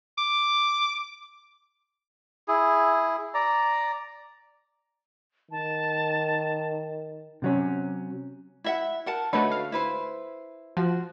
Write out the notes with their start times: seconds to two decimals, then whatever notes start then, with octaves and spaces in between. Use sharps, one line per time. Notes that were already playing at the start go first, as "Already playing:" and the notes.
0.18 D6
2.48 E4 G#4
3.34 D5 A#5
5.51 D#3 A5
7.42 C3 F#3 C#4
8.64 E4 E5 F#5
9.06 A#4 F#5 A5
9.33 D3 A3 D#4 F#4 B4 C#5
9.52 F5
9.72 E4 B4 C5
10.77 F3 F#4